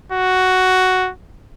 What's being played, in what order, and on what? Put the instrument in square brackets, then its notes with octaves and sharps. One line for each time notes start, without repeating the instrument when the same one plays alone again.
[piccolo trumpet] F#4